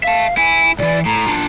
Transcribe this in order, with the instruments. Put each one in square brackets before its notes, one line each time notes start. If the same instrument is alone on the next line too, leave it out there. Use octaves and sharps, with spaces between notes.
[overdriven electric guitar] E5 A5 [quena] F5
[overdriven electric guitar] E4 [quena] G#5
[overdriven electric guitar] C2 E3 [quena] D5
[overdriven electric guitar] A2 [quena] A#5
[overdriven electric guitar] D4 F4